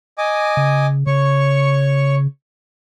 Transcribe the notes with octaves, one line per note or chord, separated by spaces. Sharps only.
D#5 G#5 D6
C#3
C#3 C#5 C#6